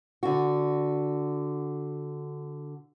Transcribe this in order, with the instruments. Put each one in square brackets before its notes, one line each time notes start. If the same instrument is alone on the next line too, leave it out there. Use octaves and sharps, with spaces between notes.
[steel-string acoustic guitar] D3 F#4